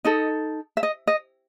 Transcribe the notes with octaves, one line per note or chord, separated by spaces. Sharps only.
D#4 A4 D#5
E5
D#5
D#5